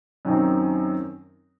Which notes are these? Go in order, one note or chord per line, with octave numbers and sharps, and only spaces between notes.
F#2 D#3 F#3 C4 D#4